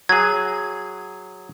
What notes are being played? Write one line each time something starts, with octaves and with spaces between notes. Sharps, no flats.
F#3 G#4 G#6